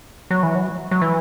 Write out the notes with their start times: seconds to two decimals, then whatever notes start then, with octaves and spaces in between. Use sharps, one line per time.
0.31 F#3
0.43 E3
0.55 F#3
0.91 F#3
1.02 E3